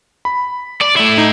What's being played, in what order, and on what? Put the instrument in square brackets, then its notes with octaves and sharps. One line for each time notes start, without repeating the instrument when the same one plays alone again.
[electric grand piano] B5
[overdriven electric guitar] D5
A3 E4
[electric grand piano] D#4